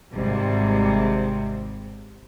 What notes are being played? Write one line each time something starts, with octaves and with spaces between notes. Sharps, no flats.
G#1 G#2 C3 G3